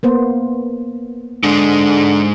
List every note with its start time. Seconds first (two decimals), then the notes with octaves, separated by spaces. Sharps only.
0.03 A#3 B3 C5
1.43 G#2 D3 G#3